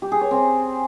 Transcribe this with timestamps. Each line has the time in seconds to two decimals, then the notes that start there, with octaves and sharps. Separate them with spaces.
0.02 G4
0.12 G#4
0.21 C#5
0.31 C4